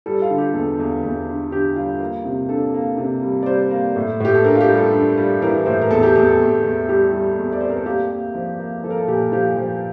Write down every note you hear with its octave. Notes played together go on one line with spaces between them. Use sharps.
G3 A4
F4
D3
G4
E2 A4
E2
E2
D3
D3 G4
G3 F4
A#3
C3
D4 A4
A#3
C3
G3
D5
G3 C5
A#3
A2
A2 G4
A4
D4 A#4
F4
G4
G3
A4
D4
G3
E3 A#4
A2 C5
A#4
E2 A4
G4
E2 G4
A4
E2
E2
G3 G4
G3
E2
D5
C4 C5
A#4
A4
A#3 G4
A#3
F3
A#3
F3 A4
A#4
A4
A#2 G4
F3 G4
F3